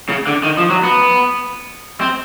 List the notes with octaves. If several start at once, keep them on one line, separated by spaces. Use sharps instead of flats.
C#3
D3
D#3
F3
F#3
B3
C4